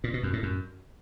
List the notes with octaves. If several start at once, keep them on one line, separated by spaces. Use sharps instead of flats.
A#2
B2
F#2
A2
F#2